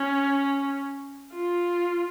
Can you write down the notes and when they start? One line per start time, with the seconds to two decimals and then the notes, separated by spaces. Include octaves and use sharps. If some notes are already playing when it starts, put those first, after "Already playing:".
Already playing: C#4
1.35 F4